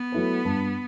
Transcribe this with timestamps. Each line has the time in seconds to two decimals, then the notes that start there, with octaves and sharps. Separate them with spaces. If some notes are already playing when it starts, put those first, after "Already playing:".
Already playing: B3
0.12 F#3 A3 E4 B4
0.45 G2